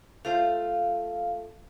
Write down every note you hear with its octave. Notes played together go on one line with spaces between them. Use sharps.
A3 F4 C5 F5